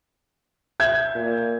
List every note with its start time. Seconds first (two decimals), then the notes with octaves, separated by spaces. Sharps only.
0.80 E5 G6 G#6
1.16 A#2